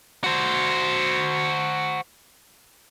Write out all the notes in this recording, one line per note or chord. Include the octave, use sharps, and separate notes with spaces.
F#4 C5